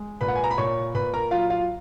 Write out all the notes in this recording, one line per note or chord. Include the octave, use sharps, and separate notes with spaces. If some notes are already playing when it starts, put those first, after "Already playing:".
Already playing: G#3
A#2 B4 B5
F#5
G#5
A#5
B5
A#2 C#5 C#6
A#2 B4 B5
A#4 A#5
F#3 F4 F5
F4 F5